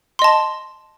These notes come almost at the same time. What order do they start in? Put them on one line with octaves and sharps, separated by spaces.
C6 D#5 A5